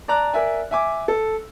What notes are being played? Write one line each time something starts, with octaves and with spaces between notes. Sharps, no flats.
D5 A5 A#5 F#6
A#4 D5 E5 G#5
E5 G#5 D6
A4